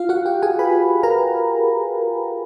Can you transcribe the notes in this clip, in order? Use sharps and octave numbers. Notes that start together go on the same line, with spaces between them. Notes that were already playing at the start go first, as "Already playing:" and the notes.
Already playing: F4 F5
F#4 F#5
G4 G5
G#4 G#5
B4 B5
A#4 A#5